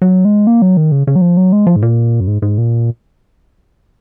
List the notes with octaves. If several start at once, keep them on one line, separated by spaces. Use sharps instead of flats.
F#3
G#3
A#3
F#3
D#3
C#3
C#3
F#3
F3
F#3
G#3
F3
G#2
A#2
F#2
G#2
G#2
A#2